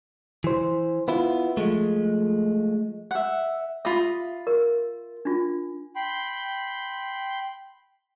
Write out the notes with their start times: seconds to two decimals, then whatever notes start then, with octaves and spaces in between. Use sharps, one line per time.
0.44 E3 C5
1.08 B3 E4 F4
1.57 F3 G#3 A3
3.11 E5 F#5
3.85 F4 E5 B5 D#6
4.47 A#4
5.25 D4 F4
5.96 G5 B5 C6